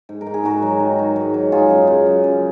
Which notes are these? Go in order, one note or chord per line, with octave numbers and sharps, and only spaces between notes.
G#2
A#4
G#2
G#4
G#2 F#4 A#4
F#3
D#3
F#3
G#2
F#3
F#3 F4 G#4
F#2
C#3
F#2
F#2